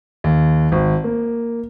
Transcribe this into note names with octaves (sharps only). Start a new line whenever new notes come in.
D#2
G#1
A#3